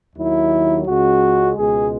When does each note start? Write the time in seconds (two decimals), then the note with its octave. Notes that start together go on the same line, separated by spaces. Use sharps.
0.16 D#2 D#3 F#3 E4
0.87 C#2 C#3 G#3 F#4
1.57 C#2 B2 G#3 G#4